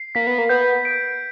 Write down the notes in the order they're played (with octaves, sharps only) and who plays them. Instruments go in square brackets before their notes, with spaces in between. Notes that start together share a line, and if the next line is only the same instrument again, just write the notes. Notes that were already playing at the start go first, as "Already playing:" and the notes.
Already playing: [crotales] C7
[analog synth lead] A#3 [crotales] B6
[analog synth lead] B3
A#3
[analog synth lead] B3 [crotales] G6
[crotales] D7